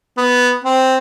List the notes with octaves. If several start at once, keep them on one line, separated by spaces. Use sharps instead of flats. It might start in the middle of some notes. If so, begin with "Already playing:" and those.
B3
C4